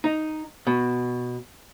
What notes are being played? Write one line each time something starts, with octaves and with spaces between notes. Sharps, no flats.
D#4
B2